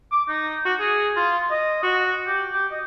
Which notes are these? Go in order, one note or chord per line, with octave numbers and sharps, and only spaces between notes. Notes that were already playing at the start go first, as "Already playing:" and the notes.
D6
D#4
F#4
G#4
F4
D#5
F#4
G4
G4
D#5